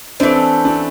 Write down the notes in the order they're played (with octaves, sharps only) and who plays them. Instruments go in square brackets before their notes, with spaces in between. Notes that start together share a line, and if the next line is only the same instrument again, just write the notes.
[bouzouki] E3 A3 C4 [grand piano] D4
[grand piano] D4